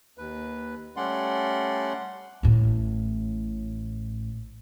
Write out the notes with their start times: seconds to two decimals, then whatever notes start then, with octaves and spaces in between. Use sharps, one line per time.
0.18 D#2 B4
0.97 G3 A3 C#4 D5 F#5 C6
2.43 A1 A2